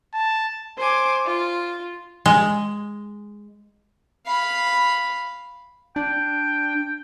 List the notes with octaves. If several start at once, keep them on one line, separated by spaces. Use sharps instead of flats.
A5
C5 G#5 D6
F4
G#3
F5 B5
D4 G5